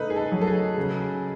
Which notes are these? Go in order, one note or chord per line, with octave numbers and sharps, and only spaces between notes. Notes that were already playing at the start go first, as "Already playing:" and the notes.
Already playing: C#3 A3 D#4 B4 D#5
G#4
A4
F#3
A4
G#4
C#3